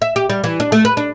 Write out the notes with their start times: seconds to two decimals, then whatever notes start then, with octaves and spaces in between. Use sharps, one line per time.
0.02 E5
0.16 G4
0.30 G3
0.44 E3
0.60 D4
0.72 A3
0.85 B4
0.97 D4